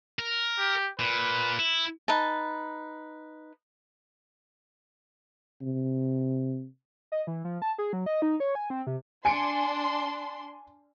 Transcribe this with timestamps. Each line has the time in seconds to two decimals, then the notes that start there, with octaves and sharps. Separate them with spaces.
0.19 A#4
0.58 G4
0.99 A#2 B4
1.59 E4
2.08 D#4 B4 A5
5.62 C3
7.12 D#5
7.27 E3
7.45 F3
7.62 A5
7.78 G#4
7.93 F#3
8.06 D#5
8.22 D#4
8.40 C#5
8.55 G#5
8.70 C4
8.87 C3
9.25 D4 G#5 C6 C#7 D7